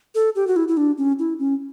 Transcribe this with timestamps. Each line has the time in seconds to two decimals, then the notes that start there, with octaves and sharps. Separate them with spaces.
0.15 A4
0.35 G4
0.47 F#4
0.56 E4
0.68 E4
0.77 D4
0.98 C#4
1.19 E4
1.39 C#4